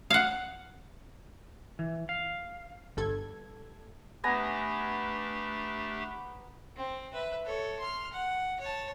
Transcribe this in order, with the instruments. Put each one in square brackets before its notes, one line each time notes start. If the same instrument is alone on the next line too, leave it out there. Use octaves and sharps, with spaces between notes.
[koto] F5 F#5
[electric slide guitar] E3
F5
[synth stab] G1 G2 A4 G#6
[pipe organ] A3 D4 G4 [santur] B3 G#5 A#5
[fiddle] C4
B4 E5
A4 C#5
C6 F6
F#5
C#5 A5